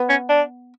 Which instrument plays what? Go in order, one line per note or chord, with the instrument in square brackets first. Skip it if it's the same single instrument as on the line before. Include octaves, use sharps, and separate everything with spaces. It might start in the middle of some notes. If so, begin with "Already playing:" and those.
Already playing: [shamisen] B3
[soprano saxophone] C#4
D4